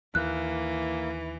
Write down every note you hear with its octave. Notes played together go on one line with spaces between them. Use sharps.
D#2 E3 A#3 F#6